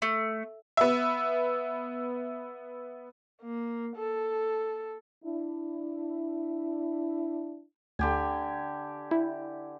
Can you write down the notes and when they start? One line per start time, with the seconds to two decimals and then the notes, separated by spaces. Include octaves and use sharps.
0.02 A3
0.77 B3 E5
3.42 A#3
3.96 A4
5.24 D4 E4
7.99 D2 D3 G4 G#5
9.11 E4